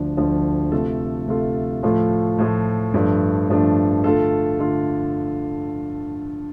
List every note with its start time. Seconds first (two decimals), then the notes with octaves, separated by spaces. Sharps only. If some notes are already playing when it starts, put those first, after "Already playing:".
Already playing: D2 D3 F3 D4
0.17 D2 D3 F3 D4
0.72 C3 A3 F4 A4
1.28 C3 A3 F4 A4
1.83 A2 F3 A3 F4
2.38 A2 F3 A3 F4
2.94 G2 F3 A3 D4
3.49 G2 F3 A3 D4
4.04 D3 A3 F4 A4
4.59 D3 A3 F4 A4